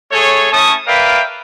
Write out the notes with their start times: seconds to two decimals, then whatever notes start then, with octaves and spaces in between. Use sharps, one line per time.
0.12 A3 G#4 A4 C#5
0.52 A3 C#4 E4 A5 C#6 D#6
0.87 A#4 B4 D5 E5 F5 G5